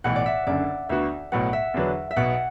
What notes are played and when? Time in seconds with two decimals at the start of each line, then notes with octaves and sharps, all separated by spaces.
0.04 B1 A2 E3 F#5
0.16 D5
0.26 E5
0.47 F#1 F#2 D3 D5
0.89 D2 D3 B3 F#4 E5
1.32 B1 A2 F#3 B3 F#5
1.53 E5
1.74 E2 D3 F#3 D4 B4
2.11 E5
2.16 B1 B2 B3 F#5